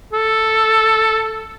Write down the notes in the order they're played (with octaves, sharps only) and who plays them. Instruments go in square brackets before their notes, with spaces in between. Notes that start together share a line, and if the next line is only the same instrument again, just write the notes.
[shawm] A4